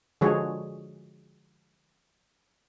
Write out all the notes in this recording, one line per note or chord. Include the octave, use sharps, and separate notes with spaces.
D3 F3 G#3 F#4 G#4 C#5